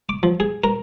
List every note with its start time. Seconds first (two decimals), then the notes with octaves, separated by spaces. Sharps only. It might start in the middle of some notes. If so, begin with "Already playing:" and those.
0.09 D6
0.23 F3
0.40 G#4
0.64 A#4